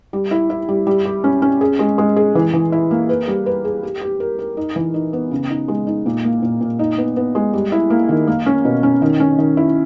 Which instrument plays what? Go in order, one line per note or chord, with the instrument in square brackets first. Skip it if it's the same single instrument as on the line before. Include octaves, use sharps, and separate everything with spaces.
[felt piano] G3
E4
E4
G3
G3
G4
C#4
C#4
G#4
G#3
G#3
G#4
E3
E3
E4
A#3
B4
G3
B4
G#4
G4
G4
A#4
A#4
D#4
E3
D#4
B3
C#3
D#4
G#3
D#4
A#2
A#3
A#2
A#2
D#4
B3
B3
G#3
G3
E4
A#3
D#3
A#3
C#4
B2
C#4
D#3
C#4
D#3
E4